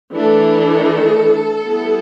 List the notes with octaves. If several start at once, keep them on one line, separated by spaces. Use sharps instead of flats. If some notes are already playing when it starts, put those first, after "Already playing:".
E3 A3 D4 A4
G3 B3 E4